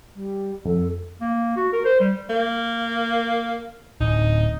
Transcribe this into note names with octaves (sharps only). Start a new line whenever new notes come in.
G3
F2 A4
A#3
F#4
A#4
C5
G3
A#3
D1 D#4